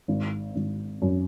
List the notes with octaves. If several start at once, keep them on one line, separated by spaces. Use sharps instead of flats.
G#1
G#1
F#2